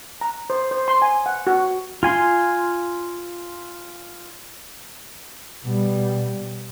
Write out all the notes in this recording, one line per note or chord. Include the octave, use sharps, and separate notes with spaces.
A#5
C5
C5
C6
G#5
F#5
F#4
F4 G#5 C6
B2 G3